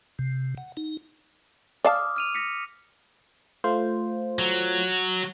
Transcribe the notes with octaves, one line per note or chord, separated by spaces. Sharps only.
C3
F#5
D#4
D5 F5 A5 D6 D#6 F6
F6 D#7 F7
A#6 B6 C#7
A3 F4 C5
F#3